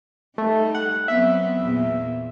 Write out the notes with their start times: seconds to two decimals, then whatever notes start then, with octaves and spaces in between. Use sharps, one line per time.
0.38 G3 A3 D#4
0.75 F#5
1.08 F#3 B3 C4 E5
1.60 E2 A#2